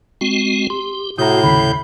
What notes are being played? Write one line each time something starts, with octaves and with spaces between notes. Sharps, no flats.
G#3 C4 F#4
G4 C6
A2 C3 F#4 A#5 D#6 G6
D#2 C#3 B5